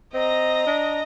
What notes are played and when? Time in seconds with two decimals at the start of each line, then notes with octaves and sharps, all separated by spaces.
0.14 C4 D#5 A#5
0.67 D4